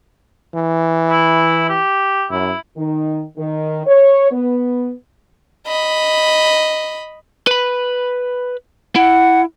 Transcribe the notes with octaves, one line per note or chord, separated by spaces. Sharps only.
E3
E4
G4
F#2 E4
D#3
D#3
C#5
B3
D#5 B5
B4 B5
E4 F#5